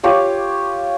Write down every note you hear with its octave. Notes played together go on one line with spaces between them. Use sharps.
F4 G4 C#5 D6